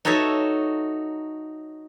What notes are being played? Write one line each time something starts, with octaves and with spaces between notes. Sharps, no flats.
D#4 F#4 A4 C#5 E5